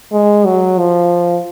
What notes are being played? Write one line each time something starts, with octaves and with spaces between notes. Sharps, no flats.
G#3
F#3
F3